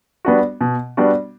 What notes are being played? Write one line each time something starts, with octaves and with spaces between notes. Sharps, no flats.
G3 B3 D4 F#4
B2
G3 B3 D4 F#4